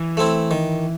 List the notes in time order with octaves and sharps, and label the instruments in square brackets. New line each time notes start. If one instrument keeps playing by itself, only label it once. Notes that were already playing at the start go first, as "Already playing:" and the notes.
Already playing: [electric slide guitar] E3
[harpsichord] A3 C4 E4
D#3